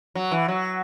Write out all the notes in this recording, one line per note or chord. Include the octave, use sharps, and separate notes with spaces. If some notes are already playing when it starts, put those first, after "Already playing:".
F#3
E3
F#3